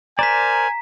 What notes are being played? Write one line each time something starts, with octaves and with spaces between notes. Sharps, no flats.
A#4 C5 D5 G#5 A#5 B6